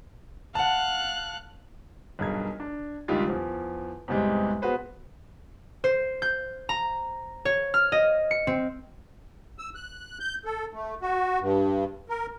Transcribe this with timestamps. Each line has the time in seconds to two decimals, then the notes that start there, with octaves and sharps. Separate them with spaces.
0.55 F5 F#5 A5 F#6
2.19 B1 G2 G#4 A#4 G#6
2.60 D4
3.08 C#2 D#3 G3 D4 F4 G4
3.28 E2 F3
4.08 E2 G#2 C3 G3 G#3
4.62 B3 F#4 G#4 B4 C5
5.84 C5
6.22 G6
6.69 A#5
7.45 C#5
7.74 F6
7.92 D#5
8.31 C#7
8.47 C4
9.59 E6
9.75 F#6
10.20 G6
10.45 A4
10.73 A3
11.02 F#4
11.40 G2
12.09 A#4